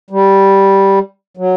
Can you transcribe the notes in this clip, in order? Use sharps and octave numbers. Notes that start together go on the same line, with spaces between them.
G3
F#3